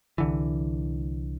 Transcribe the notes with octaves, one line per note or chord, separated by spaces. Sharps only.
C2 D3 E3